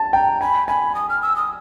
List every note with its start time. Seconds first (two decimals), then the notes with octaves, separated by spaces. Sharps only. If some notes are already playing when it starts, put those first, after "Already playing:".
Already playing: A5
0.13 G5 A#5
0.40 G#5 B5
0.67 G#5 B5
0.94 D#6
1.09 F6
1.21 E6
1.35 D#6